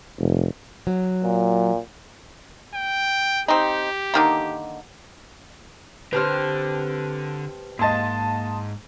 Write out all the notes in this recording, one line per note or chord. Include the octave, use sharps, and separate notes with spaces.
F1
F#3
A#2
G5
C4 D#4 G4
D3 D#3 A#3
D3 C4 G4 B4 G5 A5 F6
G#2 A#3 D#5 A5 C6 A6